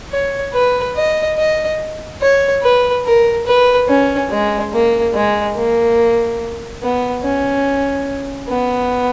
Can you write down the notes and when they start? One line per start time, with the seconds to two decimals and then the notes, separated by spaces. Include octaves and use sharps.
0.12 C#5
0.54 B4
0.96 D#5
1.37 D#5
2.21 C#5
2.63 B4
3.05 A#4
3.46 B4
3.88 C#4
4.30 G#3
4.72 A#3
5.14 G#3
5.56 A#3
6.81 B3
7.23 C#4
8.48 B3